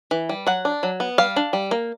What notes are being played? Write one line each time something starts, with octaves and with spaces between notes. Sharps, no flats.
E3
G3
F#3 F#5
D4
F#3
B3
G3 F5
D4
G3
A#3